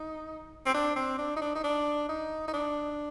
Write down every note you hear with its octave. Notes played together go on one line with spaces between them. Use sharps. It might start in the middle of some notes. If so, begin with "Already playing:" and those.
Already playing: D#4
C4
D4
C4
D4
D#4
D4
D#4
D4
D#4
D#4
D4